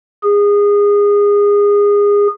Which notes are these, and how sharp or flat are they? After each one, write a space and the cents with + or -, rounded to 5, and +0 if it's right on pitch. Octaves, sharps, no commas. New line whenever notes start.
G#4 -25